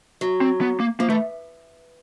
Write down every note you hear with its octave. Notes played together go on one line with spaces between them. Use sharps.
F#3
C4
B3
A#3
F3 A#3
E3 A3